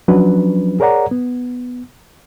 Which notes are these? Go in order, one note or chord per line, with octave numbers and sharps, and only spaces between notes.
F3 F#3 C#4 D4 B4
G#4 A#4 C#5 D5 F#5 A#5
B3